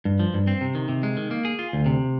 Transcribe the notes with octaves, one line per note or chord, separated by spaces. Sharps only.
G2
F3
G2
C4
C3
D#3
C3
G#3
D#3
A#3
G#4
F4
D2
C3